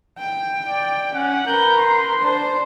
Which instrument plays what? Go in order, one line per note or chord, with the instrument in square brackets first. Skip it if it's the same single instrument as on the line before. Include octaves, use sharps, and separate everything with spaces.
[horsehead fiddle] G5
[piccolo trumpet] D5
[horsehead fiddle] C#4 [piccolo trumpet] F#5
[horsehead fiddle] A#4 B4 [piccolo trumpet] G6
[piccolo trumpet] C6
[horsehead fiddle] D4 C5